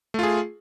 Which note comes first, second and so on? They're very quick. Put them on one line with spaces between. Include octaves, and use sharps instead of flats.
A3 F4 G#4